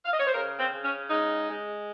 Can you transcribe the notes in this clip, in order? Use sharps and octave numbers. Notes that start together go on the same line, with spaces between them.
F5
D#5
C#5
C5
C#3 A#4
C4
C#3
C#4
G#3 D#4
G#3